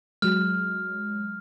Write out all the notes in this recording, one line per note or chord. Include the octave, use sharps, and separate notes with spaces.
F#3 G#3 F6